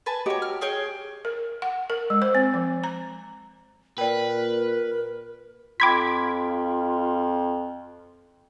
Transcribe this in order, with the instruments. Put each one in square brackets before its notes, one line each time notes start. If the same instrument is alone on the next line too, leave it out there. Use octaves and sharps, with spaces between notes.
[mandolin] B4 G#5 A5
[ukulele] F#4 G4 D#5 [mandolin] C#5 A#5
[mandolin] F6
G#4 C#5 G5
[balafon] A#4
F#5
A#4
G#3
C5
C4
F3
A#5
[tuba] A#2 [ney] A#4 [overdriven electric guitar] B4 [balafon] D5 G5
[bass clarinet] F2 [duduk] F4 [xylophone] G5 B5 C6 [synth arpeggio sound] D6 G#6 B6